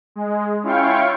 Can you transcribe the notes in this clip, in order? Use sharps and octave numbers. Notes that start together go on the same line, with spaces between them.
G#3
C#4 E4 F4 F5 G5 C#6